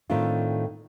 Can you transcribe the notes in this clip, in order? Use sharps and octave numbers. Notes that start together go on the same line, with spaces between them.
A2 D#3 A3 C4 D4 F4